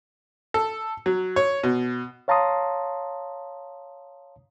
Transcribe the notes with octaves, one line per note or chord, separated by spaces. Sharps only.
A4
F#3
C#5
B2
C#5 F5 A5 A#5 C6 D#6